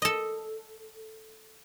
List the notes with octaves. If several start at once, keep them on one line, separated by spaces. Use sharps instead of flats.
A4 D#5